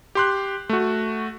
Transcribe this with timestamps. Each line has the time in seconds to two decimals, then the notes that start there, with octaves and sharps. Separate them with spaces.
0.15 G4 C6 F#6
0.69 A3 F#4